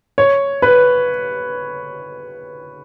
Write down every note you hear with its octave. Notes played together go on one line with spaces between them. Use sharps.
C#5
B4